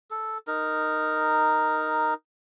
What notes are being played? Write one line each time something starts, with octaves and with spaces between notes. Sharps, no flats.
A4
D#4 A#4